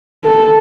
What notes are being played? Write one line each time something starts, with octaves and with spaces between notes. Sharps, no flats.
A4